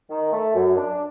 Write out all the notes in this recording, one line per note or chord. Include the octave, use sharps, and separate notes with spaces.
D#3
A3
F#2
D4